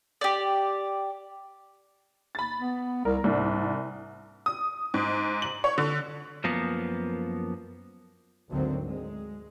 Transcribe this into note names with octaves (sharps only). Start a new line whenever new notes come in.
G4 D5
B5 A6
B3
C2 A#4
C2 G#2 D4
D#6
G#2
F#7
C#5
D3
F#2 F3 A#3 B3
G#1 D2 D3 F#3 C4
G#3